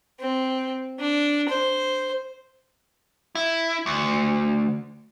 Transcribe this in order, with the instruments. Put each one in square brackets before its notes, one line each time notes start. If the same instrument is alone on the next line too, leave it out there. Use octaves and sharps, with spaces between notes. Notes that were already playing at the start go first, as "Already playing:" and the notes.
[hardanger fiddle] C4
D4
C5
[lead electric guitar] E4
D2